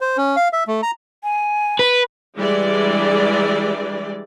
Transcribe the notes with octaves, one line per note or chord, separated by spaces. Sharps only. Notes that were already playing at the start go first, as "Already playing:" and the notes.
C5
C#4
F5
E5
A3
A#5
G#5
B4
E3 G3 G#3 D4 G#4 D5